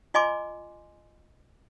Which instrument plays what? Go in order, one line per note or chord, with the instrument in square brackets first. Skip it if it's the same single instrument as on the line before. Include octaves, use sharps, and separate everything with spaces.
[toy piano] F4 D#5 G#5 C6 D6